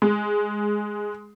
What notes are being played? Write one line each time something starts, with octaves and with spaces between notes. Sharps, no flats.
G#3